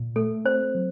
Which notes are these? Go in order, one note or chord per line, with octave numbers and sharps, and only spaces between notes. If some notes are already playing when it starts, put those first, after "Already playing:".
Already playing: A#2
A3 A4
C4 C5
F#3